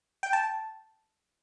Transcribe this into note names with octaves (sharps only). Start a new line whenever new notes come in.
G5
A5